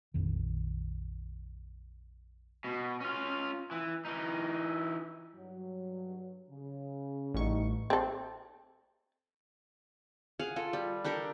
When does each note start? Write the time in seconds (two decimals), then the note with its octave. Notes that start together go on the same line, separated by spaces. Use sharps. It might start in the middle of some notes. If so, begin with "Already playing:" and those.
0.14 A#1 F2 D#3
2.64 B2
3.01 C#4 F4
3.71 E3
4.05 E3 D#4
5.35 G2 F#3
6.50 C#3
7.34 A1 G3 D#4 C#6
7.90 C4 A4
10.39 G#4 F5 F#5
10.56 F4 A4
10.73 G3
11.04 D4 G4 A4 A#4